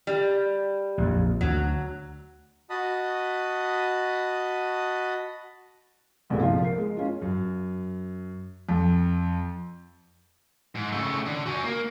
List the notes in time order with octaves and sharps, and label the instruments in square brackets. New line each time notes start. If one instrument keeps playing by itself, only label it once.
[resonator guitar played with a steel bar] G3
[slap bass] A#1 F2
[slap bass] D2 [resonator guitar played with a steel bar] F#3
[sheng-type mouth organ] F#4 D#5 A5 B5 D#6
[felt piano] G1 C2 A#2 B3 G#4 A4
F3 F4
A#4 C7
G#3
C#4 F4
[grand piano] F#2
F2
[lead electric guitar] G#2
C#3 A3
D3
F#4 G#5
A#3